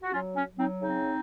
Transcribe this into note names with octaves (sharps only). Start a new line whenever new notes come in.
F#4
F#3 C#4 F4
C#4
F#3
C4 D#4
C#3 C4 D#4